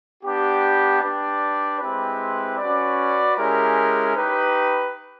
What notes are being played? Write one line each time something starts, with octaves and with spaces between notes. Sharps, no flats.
B3 D4 G4
D4 G4 B4 D5
G#3 C4 E4 G4 B4
C#4 F#4 B4 D5
G#3 C#4 E4 G4 A#4
D#4 G4 B4